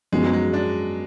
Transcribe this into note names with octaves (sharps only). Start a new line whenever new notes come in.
F#2 F3 G#3 B3 D#4 G#4
F#3
G#3
D4